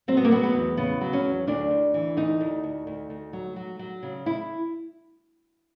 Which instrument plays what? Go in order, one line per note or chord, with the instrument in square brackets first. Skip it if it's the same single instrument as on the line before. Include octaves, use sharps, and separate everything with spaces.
[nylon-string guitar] F#3 C4
B3
A#3
F#3 B3
B3
E2
C#3 B3
F#3
C#4
E2
D2 D4
D2
E3
D2 D#4
D2
D2
D2
D2
F#3
F#3
F#3
C#3
E4